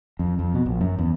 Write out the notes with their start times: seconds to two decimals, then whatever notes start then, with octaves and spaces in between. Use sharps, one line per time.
0.19 F2
0.39 F2
0.54 B2
0.66 A#1
0.81 F#2
0.99 E2